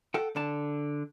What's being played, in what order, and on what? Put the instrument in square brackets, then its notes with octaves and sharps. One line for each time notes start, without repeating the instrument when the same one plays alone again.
[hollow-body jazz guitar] A4 F#5 G5
D3 A5